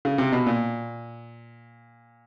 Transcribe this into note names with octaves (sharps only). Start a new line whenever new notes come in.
C#3
C3
B2
A#2